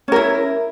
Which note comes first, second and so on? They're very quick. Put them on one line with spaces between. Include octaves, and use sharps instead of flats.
C#4 A#4 E4